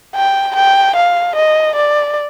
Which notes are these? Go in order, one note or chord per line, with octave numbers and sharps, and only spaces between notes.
G5
G5
F5
D#5
D5